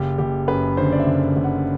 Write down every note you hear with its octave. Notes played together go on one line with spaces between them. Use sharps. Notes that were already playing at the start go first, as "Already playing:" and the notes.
Already playing: F#1 G4
F#1 G4
F#2 B4
D3 C5
D5
E5
F#1
F#1
F#5